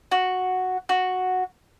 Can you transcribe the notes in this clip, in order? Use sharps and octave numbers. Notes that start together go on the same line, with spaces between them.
F#4
F#4